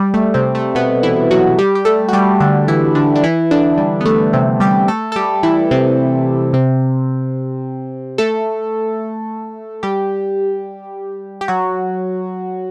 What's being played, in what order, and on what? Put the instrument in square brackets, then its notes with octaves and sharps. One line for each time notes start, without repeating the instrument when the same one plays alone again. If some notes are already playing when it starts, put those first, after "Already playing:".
Already playing: [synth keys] G3
A3
C3 C4
A3
B2 B3
E3 E4
F#3 F#4
G3 G4
G4
A3 A4
F#4
G3 G4
D3 D4
E3 E4
D3 D4
D4
E3 E4
D3 D4
G3
B3
A3
C3 C4
G3 G4
A3 A4
A4
G3 G4
E3 E4
C3 C4
C3 C4
A3 A4
G3 G4
G4
F#3 F#4